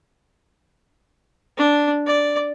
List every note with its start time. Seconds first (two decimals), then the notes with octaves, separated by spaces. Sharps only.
1.58 D4
2.07 D5